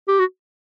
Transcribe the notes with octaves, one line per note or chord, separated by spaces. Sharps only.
G4
F#4